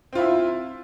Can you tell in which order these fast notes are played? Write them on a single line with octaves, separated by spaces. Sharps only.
C4 F4 E4